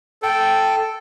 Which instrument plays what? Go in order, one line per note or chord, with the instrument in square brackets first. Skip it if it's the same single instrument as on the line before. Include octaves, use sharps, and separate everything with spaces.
[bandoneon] A4 [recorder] G5